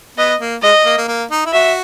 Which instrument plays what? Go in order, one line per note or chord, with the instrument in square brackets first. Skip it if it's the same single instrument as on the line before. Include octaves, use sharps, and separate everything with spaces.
[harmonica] B3 [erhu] D#5
[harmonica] A#3
[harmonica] G#3 [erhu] D#5
[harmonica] A#3
A#3
A#3
D#4
E4
[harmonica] F#4 [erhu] E5